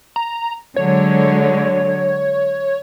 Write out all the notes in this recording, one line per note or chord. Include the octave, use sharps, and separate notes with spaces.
A#5
D3 F#3 G#3 C#5